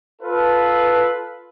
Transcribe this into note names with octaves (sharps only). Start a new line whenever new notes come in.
F4 A4 B4